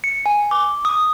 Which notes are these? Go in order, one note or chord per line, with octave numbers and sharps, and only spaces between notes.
C#7
G#5
D6
D#6